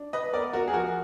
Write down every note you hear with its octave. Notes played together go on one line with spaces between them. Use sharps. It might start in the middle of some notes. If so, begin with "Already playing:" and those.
Already playing: D4
B4 D#5
B3 A#4 D5
F#4 A#4
G#4
F3 F#4 A#4